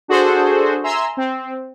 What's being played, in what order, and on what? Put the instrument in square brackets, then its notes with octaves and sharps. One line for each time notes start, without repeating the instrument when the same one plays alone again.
[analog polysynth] D4 F#4 G#4 A4 C5
E5 G#5 A#5 C6 E6
C4